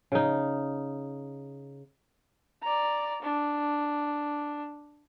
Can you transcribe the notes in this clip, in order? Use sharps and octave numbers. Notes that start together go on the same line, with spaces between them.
C#3 D#4
D5 A#5
D4